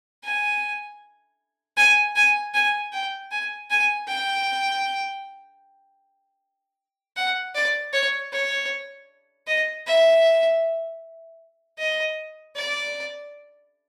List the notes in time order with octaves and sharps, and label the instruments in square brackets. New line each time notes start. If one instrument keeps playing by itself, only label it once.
[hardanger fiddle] G#5
G#5
G#5
G#5
G5
G#5
G#5
G5
F#5
D5
C#5
C#5
D#5
E5
D#5
D5